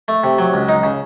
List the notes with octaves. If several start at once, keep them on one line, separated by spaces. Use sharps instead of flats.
A3
C3
F#3
C#2
D#4
C#3